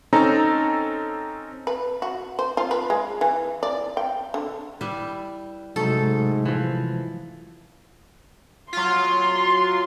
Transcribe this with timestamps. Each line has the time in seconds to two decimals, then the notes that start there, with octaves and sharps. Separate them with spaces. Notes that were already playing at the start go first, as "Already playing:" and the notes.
0.13 C4 C#4 D#4 A4 A#5
1.67 B4
2.02 F#4
2.39 C5
2.57 F4
2.71 B4
2.90 G#3
3.21 E3
3.63 D5
3.97 G5
4.34 D3
4.81 G3 E4 B4 E5
5.76 G#2 C3 F#3 G#3 A3 D#4 A4
6.45 E3 F3
8.73 F#3 F4 C6